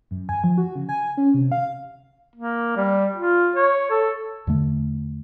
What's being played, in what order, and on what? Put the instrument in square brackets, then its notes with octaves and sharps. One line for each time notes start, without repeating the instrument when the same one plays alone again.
[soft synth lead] F#2
G#5
F3
F#4
C#3
G#5
C#4
C3
F5
[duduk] A#3
G3
F4
C#5
A4
[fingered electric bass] E2 D3 A3